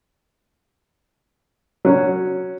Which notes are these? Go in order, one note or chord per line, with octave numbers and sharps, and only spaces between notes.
F#3 C#4